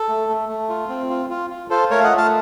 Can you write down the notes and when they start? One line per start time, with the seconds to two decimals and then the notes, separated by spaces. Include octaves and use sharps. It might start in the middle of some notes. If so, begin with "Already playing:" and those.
Already playing: A4
0.09 A3
0.29 A3
0.49 A3
0.69 F4
0.89 C4
1.10 F4
1.30 F4
1.50 F4
1.70 F4 A4 C5
1.91 A3 A#4 C#5
2.00 F5
2.04 D#5 F#5
2.11 A3
2.18 F5 A5